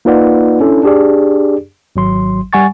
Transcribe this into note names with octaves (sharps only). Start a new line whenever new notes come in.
A#3 D#4 F4 B4 D5 F#5
C#4 D4 E4 A4
D4 G4 G#4 D5
G#1 F#3 C6
G3 F#5 G#5 C#6 A6